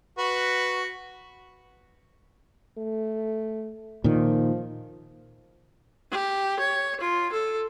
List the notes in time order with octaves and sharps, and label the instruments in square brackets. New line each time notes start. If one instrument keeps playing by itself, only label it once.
[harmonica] F#4 B4
[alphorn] A3
[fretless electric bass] A#2 D#3 [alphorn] F3
[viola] G4
C#5
F4
A4